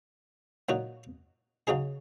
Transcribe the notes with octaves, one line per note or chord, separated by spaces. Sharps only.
A#2 F#3 D#4 F#4
C#3 F#3 D#4 G#4